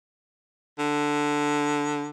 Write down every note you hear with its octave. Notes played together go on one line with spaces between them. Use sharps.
D3